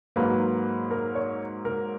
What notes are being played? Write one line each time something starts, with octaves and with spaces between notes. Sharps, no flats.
G#2 F#3 A#3 B4
A#4
C#5
A#4